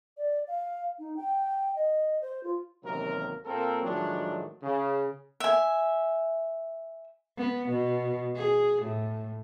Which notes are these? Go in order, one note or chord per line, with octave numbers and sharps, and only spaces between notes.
D5
F5
D#4
G5
D#5
C5
F4
A1 D#2 C3 F#3 A#4
A#2 A#3 C4 A4 A#4
A2 D#3 F3 F#3 G#3 D4
C#3
E5 G#5
B3
B2
G#4
A2